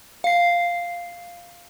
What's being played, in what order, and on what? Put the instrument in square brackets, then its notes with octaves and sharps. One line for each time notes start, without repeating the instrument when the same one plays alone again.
[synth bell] F5 C7